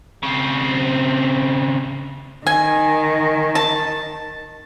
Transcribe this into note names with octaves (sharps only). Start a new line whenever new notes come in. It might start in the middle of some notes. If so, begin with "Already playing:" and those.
C#3 C4
D#3 G#5
A5